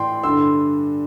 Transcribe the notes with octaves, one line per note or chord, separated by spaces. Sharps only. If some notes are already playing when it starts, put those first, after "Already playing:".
Already playing: A2 E3 D5 G5 C6
G2 D3 C6 E6